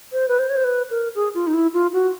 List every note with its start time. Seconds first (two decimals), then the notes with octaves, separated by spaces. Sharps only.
0.12 C5
0.28 B4
0.39 C5
0.49 C#5
0.56 C5
0.64 B4
0.90 A#4
1.15 G#4
1.35 F4
1.47 D#4
1.54 E4
1.73 F4
1.93 F#4